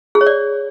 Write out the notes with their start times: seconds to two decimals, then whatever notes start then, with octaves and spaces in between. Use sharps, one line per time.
0.15 G#4
0.21 C#5
0.27 D5